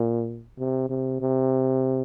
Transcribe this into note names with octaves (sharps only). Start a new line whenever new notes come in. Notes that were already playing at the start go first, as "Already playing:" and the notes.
Already playing: A#2
C3
C3
C3